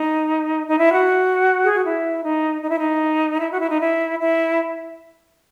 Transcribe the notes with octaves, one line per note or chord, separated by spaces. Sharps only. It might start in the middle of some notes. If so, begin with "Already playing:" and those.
Already playing: D#4
D#4
E4
F#4
G#4
F#4
E4
D#4
D#4
E4
D#4
E4
F#4
E4
D#4
E4
E4